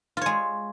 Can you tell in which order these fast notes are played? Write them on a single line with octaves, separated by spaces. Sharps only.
F4 C#5 G#3